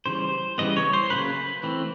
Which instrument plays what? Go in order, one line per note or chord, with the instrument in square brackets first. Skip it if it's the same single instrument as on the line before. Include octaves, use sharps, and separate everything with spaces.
[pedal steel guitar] C#3 E3 G3 C5
C#3 E3 G3 B3 D#5
C#5
C5
C#3 F#3 A#3 C#4 B4
E3 A3 C4